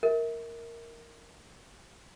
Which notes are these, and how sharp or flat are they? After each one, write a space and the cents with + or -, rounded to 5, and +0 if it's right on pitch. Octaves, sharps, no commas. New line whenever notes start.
A#4 -5 E5 -30